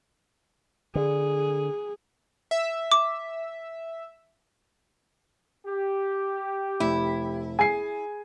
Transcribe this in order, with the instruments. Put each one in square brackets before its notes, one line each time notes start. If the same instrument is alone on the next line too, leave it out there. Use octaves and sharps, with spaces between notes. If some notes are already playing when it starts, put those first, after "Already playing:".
[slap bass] D3 [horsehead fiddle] G#4
[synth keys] E5
[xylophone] D6
[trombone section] G4
[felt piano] F1 [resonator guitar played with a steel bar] E4
[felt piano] G#4 [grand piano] G#5 C7